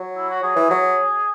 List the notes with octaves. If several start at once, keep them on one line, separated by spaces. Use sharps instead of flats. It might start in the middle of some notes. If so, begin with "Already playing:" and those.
Already playing: F#3
E4
F#4
F#3 G#4
E3
F#3